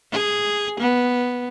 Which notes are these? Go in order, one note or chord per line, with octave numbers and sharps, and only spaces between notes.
G#4
B3